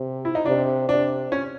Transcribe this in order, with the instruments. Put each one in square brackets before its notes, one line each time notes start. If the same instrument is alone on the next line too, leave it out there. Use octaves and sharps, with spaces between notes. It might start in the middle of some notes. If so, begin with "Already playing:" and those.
Already playing: [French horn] C3
[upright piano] E4
D#4
[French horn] C3 [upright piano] D4
[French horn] C3 [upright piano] D4
[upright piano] C#4